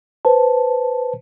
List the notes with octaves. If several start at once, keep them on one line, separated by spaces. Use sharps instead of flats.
B4 C5 A5